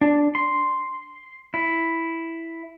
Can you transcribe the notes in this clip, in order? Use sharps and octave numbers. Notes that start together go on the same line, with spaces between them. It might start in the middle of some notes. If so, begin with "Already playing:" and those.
D4
C6
E4